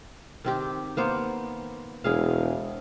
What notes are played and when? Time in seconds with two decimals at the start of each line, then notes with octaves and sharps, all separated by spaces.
0.45 D#3 C4 G4
0.97 A#3 B3 C5
2.04 E1 E4 G#4 F5